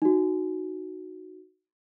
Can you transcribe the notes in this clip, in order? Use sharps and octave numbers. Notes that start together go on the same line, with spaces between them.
D#4 F#4